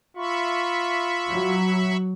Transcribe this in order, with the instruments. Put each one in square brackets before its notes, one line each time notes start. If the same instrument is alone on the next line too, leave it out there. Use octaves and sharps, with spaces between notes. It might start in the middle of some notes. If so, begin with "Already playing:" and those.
[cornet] F4 [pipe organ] E5 B5 C#6
[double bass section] F#3